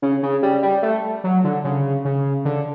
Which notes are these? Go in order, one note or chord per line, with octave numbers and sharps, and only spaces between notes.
C#3
C#3
G3
G3
A3
F#3
D3
C#3
C#3
D3